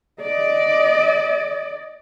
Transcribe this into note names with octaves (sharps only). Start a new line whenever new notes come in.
D5 D#5